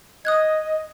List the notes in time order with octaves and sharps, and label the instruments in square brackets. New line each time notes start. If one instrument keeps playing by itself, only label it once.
[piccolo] D#5 [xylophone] D#6 F#6 G#6